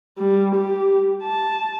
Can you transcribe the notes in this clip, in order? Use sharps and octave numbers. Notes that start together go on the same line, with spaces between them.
G3
G4
A5